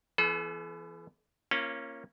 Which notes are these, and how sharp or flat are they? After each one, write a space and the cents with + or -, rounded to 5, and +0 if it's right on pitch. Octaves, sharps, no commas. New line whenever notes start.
E3 +30 B3 +0 A4 -45
A#3 +0 C#4 -15 F4 -35